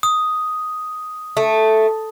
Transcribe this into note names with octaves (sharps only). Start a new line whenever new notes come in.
D#6
A3